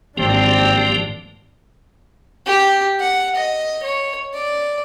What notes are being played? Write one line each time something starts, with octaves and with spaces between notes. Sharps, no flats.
G#1 F3 A#3 C4 D4 G4
G4
F#5
D#5
C#5
D5